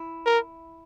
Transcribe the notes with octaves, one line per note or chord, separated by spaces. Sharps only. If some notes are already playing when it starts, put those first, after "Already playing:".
Already playing: E4
A#4